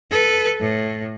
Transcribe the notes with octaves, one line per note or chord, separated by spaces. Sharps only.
A4 B4
A2